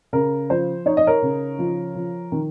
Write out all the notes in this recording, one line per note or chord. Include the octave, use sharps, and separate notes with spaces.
C#3 A#4
F3 C5
D#4 C#5
D#5
A#4 C#5
C#3
F3
F3
D#3